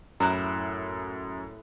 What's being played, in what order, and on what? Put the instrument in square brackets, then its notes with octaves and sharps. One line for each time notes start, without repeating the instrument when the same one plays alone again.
[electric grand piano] F#2 F#6 [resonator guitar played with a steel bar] A2 E4 A#5